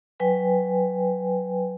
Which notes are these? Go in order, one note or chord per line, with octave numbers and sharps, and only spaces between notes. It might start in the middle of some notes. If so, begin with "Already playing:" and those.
F#3 B4 G5 G#5